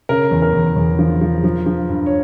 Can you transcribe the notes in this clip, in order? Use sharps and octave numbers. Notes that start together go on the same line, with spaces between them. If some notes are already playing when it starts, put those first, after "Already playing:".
C#3 A#4
E2
A#4
E2
E2
F3
F3
F3
F3
G2
C#5